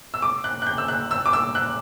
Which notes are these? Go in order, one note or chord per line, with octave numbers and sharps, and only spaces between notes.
E6
D6
F#6
F#6
G6
E6
F#6
E6
D6
E6
F#6